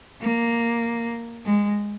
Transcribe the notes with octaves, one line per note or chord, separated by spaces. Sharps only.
A#3
G#3